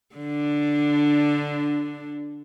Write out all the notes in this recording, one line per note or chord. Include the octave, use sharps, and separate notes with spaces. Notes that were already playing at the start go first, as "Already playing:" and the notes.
D3 D4